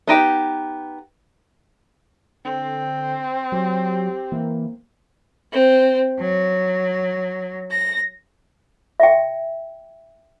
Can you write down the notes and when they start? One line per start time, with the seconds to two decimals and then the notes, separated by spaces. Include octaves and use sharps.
0.07 B3 D#4 G4 F#5
2.45 D3 C4
3.52 F#3 G4
4.32 E3 A#3
5.52 C4
6.21 F#3
7.72 A#6
9.00 E5 G5